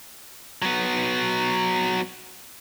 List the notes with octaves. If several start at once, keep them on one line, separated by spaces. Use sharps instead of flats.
F#3 B3